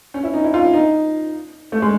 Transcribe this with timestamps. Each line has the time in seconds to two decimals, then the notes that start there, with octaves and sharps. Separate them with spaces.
0.14 C#4
0.24 E4
0.34 D#4
0.44 E4
0.54 F4
0.63 E4
0.74 D#4
1.72 A3
1.82 G#3